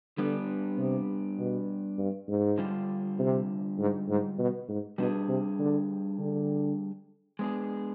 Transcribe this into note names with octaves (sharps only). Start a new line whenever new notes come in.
D3 G3 B3 D4
C3
B2
G2
G#2
D3 G3 D4 F4
C3
G#2
G#2
B2
G#2
B2 G3 D4 G#4
C3
D3
D3
G#3 B3 D4 G#4